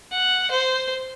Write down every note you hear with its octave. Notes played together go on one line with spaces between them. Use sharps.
F#5
C5